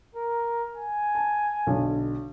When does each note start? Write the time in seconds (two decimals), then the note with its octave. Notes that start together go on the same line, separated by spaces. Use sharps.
0.15 A#4
0.76 G#5
1.15 A5
1.67 B1 D3